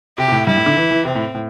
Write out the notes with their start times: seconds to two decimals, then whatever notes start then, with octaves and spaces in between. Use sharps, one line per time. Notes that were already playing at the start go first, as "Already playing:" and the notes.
0.17 C3 G4
0.28 C3
0.32 A2
0.46 G2 E4
0.57 A2
0.66 D3
0.76 E3
0.91 E3
1.05 C3 C4
1.15 A2
1.35 A2